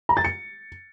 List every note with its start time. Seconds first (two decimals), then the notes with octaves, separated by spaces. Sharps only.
0.09 A#5
0.17 A6
0.24 C#7